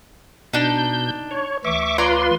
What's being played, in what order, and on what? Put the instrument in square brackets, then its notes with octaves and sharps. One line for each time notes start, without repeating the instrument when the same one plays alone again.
[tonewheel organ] B2 G6 [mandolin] D4 D#4
[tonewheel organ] C#5
[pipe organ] D2 E3 [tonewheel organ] E5 C#6 D6
[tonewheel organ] F4 B4 C6 [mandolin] C#5 D5 A#5